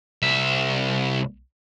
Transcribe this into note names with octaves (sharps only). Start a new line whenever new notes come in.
C2 E5